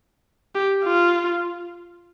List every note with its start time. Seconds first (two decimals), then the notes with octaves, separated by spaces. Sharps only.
0.55 G4
0.84 F4